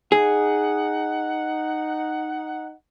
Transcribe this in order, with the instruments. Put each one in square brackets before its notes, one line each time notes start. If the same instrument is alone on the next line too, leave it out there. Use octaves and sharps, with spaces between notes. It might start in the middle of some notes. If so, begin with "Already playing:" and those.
[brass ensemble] D#4 F#5 [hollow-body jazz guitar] G#4